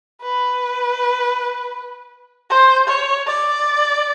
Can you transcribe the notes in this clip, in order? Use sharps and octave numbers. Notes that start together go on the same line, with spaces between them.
B4
C5
C#5
D5